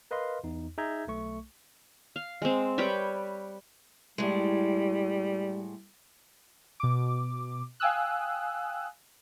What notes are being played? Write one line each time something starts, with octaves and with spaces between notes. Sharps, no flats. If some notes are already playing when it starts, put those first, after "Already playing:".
A#4 B4 D#5 F5 C6
E2 D#4
D#4 G#4 E5 A#5 G6 G#6
B1 A3 C#6
F5
G#3 C4
G3 B4 C#5 G5
A2 G3 G#3
B2 D6
F5 G5 G#5 D#6 E6 F#6